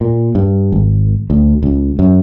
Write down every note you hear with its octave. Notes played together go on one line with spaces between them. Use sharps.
A#2
G2
G#1
D2
C#2
F#2